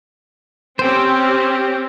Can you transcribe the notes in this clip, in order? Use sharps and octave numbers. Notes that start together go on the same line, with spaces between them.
C4 C#4 G4 C5 G5